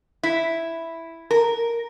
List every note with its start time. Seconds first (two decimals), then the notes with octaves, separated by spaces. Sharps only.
0.23 E4
1.31 A#4